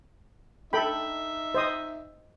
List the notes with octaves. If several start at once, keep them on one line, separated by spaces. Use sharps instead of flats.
D#4 A4 E5 G5 B5
C5 D#5 D#6